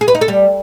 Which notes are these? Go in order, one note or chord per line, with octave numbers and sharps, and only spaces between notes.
G#4
B4
D#4
A4
G3